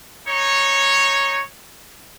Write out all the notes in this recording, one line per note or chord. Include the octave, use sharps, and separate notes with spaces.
D#4 C#5